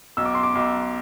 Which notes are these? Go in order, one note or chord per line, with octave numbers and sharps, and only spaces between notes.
B1 E6
D6
C6
D6
B1